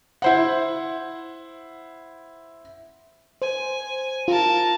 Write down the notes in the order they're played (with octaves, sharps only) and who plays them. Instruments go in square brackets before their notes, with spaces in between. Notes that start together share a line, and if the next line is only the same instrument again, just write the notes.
[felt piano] E4 C5 F#5
[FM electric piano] C5 [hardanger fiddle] G#5
[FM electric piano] F4 [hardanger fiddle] A#4 A5